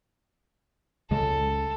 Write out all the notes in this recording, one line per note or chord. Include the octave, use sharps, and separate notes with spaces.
C#2 C#3 G#3 A4